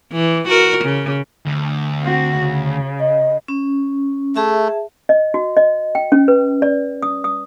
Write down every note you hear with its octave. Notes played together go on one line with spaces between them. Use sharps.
E3
F#4 A#4
C#3
D2
C4 F#4
C#3
D#5
C#4
A3 G#4 E5 A5
D#5
F#4
D#5
G5
C#4
B4
D5
D#6
D#6